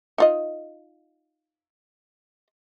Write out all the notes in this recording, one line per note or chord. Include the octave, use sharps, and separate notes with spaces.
D#4 F4 D#5